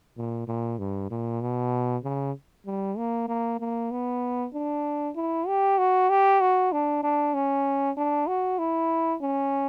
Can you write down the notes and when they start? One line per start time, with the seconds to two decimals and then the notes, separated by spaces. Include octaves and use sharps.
0.17 A#2
0.47 A#2
0.79 G2
1.10 A#2
1.41 B2
2.04 C#3
2.66 G3
2.97 A#3
3.28 A#3
3.60 A#3
3.91 B3
4.54 D4
5.16 E4
5.47 G4
5.78 F#4
6.10 G4
6.41 F#4
6.72 D4
7.03 D4
7.34 C#4
7.97 D4
8.28 F#4
8.59 E4
9.21 C#4